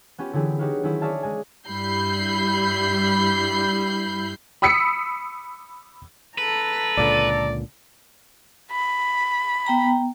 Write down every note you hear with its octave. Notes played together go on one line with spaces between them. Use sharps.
B3 C#4 F4 G4
D3 E3 F#3 E4 G4 G#4
D#4 F#4 G4 B4 C#5 F5
D#3 F#3 C4 C#4 E4
G#4 C#5 D5 E5 F5 A5
G#3 G#5
G2 G3 E4 B5 G6 C7
B5 D#6 E6 B6 C#7
A4 B4 A#5
C#2 A#2 D3 D5
B5
B3 G5 A#5